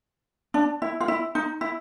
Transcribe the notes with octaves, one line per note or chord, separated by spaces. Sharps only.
D4
E4
F4
E4
D#4
E4